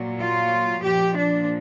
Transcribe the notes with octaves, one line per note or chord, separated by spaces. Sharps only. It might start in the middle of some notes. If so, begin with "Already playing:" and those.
Already playing: A#2 F#3
F4
A#2 F3 G4
D4